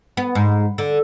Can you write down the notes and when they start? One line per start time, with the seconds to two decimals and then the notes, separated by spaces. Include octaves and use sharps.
0.17 B3
0.35 G#2
0.78 D3